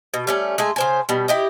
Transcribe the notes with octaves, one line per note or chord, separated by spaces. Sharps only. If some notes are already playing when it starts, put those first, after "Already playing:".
B2
G3 A3 C#4
G#3 A3 G#5
C#3 C5 G#5
B2 G3
E4 G4 D#5